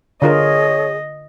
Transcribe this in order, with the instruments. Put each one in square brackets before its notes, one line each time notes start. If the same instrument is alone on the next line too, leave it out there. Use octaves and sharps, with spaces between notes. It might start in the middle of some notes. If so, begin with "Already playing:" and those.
[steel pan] D3 F4 A#4 [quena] G#4 [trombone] C#5 [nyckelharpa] D#5